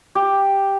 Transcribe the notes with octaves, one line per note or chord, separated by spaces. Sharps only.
G4